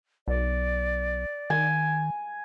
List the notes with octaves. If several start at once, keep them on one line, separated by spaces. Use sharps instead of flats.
B1 D5
D#3 G#5